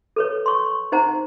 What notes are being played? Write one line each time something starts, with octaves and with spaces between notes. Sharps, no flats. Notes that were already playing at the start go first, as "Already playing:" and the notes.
A4 B4 C#5
C6 C#6
D#4 C5 F#5 A#5